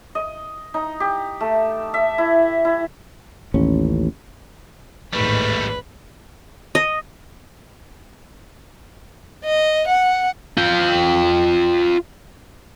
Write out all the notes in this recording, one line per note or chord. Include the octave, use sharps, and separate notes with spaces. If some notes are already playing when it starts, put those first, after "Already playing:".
D#5
D#4
G4
A3
E5
E4
E4
A1 D#2 C#4
A1 D#2 G#2 G3 A3 B4
D#5
D#5
F#5
F4 G5